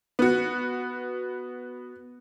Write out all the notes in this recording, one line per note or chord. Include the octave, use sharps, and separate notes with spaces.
B3 F#4